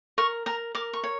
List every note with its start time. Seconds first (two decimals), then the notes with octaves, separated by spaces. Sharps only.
0.18 A#4 C#6
0.46 A#4 A#5
0.75 A#4 D6
0.93 C#6
1.04 C#5